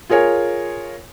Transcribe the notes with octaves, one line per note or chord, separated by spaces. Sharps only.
F4 G#4 A#4 C#5 G#5